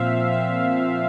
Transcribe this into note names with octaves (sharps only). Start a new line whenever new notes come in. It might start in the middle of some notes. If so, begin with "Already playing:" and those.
Already playing: A#2 F3 C4 E5 F5
E5